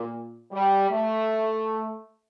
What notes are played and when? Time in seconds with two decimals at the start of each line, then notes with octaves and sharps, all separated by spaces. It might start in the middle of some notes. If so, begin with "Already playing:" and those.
Already playing: A#2
0.52 G3
0.90 A3